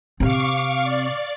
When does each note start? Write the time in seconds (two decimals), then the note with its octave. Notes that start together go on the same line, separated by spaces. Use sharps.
0.20 C3 C4 F5 C#6 D6
0.84 D5